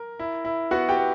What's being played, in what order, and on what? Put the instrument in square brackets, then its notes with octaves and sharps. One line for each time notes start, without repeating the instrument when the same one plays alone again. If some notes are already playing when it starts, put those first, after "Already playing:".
Already playing: [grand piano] A#4
E4
E4
B3 F#4 F#5
G4 G5
B3